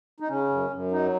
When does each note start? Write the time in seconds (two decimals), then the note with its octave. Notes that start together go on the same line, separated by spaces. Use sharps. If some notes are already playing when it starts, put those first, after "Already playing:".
0.20 D#4
0.28 C#3 C#4
0.49 F#2
0.70 F#2
0.91 F#3 D#4